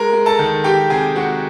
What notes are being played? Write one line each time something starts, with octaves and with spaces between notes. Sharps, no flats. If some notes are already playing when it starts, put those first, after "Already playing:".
Already playing: G#3 A#4 A#5
G#3
A4 A5
D#3
D#3 G4 G5
C3 G#4 G#5
G#3 F#4 F#5